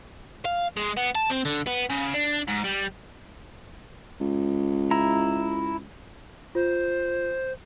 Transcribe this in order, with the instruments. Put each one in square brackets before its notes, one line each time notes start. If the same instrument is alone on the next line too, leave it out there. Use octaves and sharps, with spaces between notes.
[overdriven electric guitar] F5
G#3
B3
A5
C4
D3
B3
C#3
D4
G#2
G3
[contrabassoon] C#2
[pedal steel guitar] E4 A#5
[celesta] F4 [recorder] C5